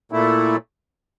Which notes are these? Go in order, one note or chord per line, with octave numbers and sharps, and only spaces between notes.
A#2 A3 E4